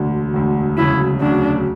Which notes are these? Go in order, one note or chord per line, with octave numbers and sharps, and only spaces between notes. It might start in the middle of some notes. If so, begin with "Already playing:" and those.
Already playing: E1 D2 D3
E1 D2 D3
E1 D2 C#3 F#3 E4
E1 D2 C#3 F#3 D4